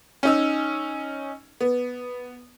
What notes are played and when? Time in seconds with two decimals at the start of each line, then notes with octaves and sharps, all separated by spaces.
0.23 C#4 D#4 E6
1.61 B3